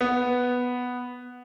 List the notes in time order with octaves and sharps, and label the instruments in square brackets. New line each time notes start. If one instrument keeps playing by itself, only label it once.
[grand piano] B3